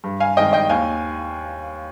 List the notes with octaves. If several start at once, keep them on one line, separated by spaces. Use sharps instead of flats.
G2
F5 G#5
D#3 G#3 C4 D#5 G5
D#5 G5
D#2 F5 G#5